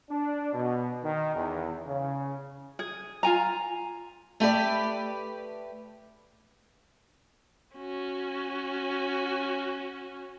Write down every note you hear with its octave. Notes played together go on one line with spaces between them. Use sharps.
D4
B2
D#3
E2
C#3
G#4
F4 G#5 A#5
A3 G4 B4 D5
C#4 F#4